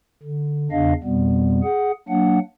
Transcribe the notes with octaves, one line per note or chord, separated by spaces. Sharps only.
D3
E2 C#3 D4 D#5 F5
F2 B2 G3 B3
G#4 F#5
F#3 A#3 D4 F#5